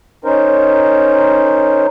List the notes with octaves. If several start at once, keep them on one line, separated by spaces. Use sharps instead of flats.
C#4 D#4 A#4 C5